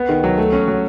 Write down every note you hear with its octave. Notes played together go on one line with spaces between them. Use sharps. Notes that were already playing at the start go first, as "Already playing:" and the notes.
Already playing: B3
D#3
F#3
A3
C#4
F#3